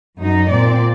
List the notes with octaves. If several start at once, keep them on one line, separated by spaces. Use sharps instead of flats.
F#2 F#3 D#4
A#2 C4 D5